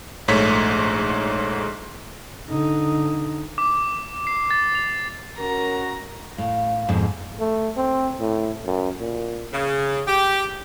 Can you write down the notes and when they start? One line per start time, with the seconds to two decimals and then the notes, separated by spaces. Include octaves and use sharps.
0.28 A#1 G#2 A3 C#5 B6
2.50 D3 D#4
3.58 D6
4.27 C7
4.51 A6
4.75 F7
5.39 C#4 F#4 A#4 A#5
6.38 A2 F5
6.89 F2 G#2 B2
7.40 A3
7.77 C4
8.20 A2
8.65 F#2
8.99 A#2
9.53 C#3
10.07 G4